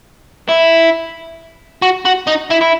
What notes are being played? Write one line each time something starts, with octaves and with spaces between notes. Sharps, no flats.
E4
F#4
F#4
D#4
E4
E4